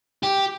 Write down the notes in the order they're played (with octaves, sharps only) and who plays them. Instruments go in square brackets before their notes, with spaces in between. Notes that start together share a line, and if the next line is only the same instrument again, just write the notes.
[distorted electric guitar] G4